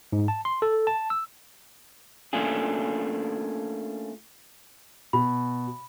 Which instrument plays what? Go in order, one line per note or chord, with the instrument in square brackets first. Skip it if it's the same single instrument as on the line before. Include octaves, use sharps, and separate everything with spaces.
[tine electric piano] G#2
A5
C6
A4
A5
E6
[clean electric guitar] A3 A#3 C#4 D4 F4 G#4
[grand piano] B2 [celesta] B5